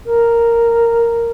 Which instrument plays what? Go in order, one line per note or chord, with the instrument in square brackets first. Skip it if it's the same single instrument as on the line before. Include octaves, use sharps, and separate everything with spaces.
[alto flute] A#4